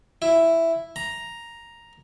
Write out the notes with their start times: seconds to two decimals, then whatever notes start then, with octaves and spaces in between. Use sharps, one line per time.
0.22 E4
0.96 A#5